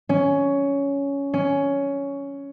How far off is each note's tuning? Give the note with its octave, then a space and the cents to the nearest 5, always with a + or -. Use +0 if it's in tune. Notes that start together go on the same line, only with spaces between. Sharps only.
C#4 +10
C#4 +10